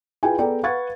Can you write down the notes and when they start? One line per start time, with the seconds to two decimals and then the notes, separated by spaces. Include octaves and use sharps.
0.23 E4 F4 G#4 B4 G5 G#5
0.38 B3 G#4 A4 D5 G5 A#5
0.63 B4 F5 F#5 C#6 G#6 A6